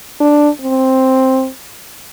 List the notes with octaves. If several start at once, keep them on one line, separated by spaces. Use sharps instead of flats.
D4
C4